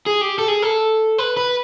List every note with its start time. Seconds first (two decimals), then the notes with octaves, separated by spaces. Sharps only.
0.06 G#4
0.21 G4
0.38 A4
0.48 G#4
0.62 A4
1.18 B4
1.37 B4